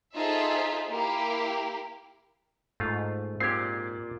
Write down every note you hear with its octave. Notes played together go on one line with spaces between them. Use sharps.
D#4 F4 G#4 A4 C5 E5
A#3 E4 G4 A#4
G#2 A3 F4
A#2 C4 G4 D5 G#6 C7